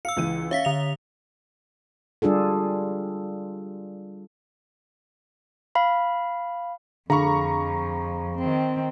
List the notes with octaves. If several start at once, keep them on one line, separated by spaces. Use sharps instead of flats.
F5 E6 C#7
C#2 E3 D#7
C#4 E5 F5 B6
D3 F7
G3 D4 F4 G#4 A4
F5 B5
F2 D3 F3 G#4 F5 A#5 B5 C#6
D#3 C4